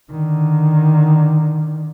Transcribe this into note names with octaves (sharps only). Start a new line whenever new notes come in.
D3 D#3